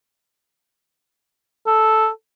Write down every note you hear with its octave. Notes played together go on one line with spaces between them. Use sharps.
A4